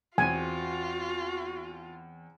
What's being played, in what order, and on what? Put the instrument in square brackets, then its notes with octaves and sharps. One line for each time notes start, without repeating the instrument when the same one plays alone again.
[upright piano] E2 C4 [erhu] F4 [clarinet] F#4 [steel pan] G#5